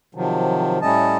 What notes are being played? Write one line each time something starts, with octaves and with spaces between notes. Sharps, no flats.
C3 D#3 F3 F#3
A2 G3 A3 C#4 D#5 A5